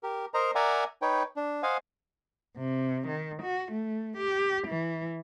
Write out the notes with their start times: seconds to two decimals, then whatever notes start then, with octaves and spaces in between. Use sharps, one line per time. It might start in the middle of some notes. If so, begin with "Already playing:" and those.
0.03 G4 A#4
0.34 A#4 C5 D#5 A#5
0.55 A#4 D5 E5 F#5 G#5 A#5
1.02 D#4 B4 C#5 G5
1.36 D4
1.63 C5 D#5 F5 F#5 G#5
2.57 C3
3.07 D#3
3.42 F#4
3.72 A3
4.17 G4
4.67 E3